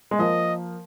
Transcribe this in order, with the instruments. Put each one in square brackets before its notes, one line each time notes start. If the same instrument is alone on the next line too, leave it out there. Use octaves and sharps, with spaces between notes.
[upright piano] G#3
[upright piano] F3 A#3 [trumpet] D#5